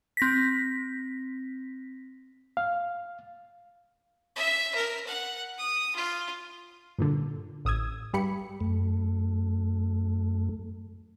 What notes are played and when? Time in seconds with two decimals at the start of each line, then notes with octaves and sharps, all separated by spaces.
0.17 C4 A#6 B6
2.57 F5
4.36 E5
4.75 A#4
5.07 F#5
5.58 D#6
5.96 F4
6.99 G2 A#2 D3
7.65 A1 D#6 E6 G#6
8.13 G2 G4 B5 C#7
8.61 F#2 A3